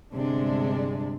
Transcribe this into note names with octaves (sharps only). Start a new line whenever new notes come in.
G1 C3 G#3 D4